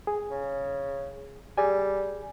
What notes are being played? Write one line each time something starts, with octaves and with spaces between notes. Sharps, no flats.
G#4
C#3
G3 G#4 D5 G#5